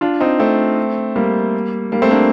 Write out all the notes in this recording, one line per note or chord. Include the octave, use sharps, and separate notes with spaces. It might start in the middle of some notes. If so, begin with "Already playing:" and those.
D4 F4
C4 D#4
A3 C4
G3 A#3
G3 A#3
A3 C4
A#3 D4